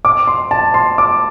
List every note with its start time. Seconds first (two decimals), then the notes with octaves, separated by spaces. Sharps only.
0.05 D6
0.27 C6
0.51 A5
0.74 C6
0.98 D6